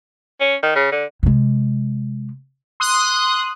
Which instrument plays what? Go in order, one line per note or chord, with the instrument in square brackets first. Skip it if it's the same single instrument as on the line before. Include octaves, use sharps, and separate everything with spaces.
[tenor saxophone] C#4
D#3
C#3
D3
[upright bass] C3 G#3
[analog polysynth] C6 D#6 F#6